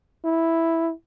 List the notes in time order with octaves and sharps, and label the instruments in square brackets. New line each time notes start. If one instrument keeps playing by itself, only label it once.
[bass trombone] E4